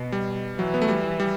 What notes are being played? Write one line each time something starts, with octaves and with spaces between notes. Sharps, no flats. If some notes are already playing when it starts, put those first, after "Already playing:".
Already playing: B2
G3
E3 F#3
B3
A3
G3
G3